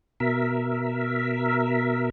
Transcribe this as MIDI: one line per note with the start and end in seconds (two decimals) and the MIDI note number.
0.20 2.10 47
0.20 2.10 70
0.20 2.10 76